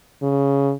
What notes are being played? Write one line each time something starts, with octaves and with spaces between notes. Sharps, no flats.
C#3